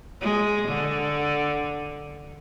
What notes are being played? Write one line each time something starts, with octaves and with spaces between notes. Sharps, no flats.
G#3
D3